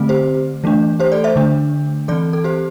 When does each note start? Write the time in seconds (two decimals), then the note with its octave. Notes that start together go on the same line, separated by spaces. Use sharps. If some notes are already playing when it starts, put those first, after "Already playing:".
Already playing: D3 A3 C4
0.09 G4 C5
0.64 E3 A3 D4
1.00 G4 C5
1.12 A4 D5
1.24 C5 E5
1.36 D3 A3 D4
2.08 E3 C4 A4 D5
2.33 A4
2.44 G4 C5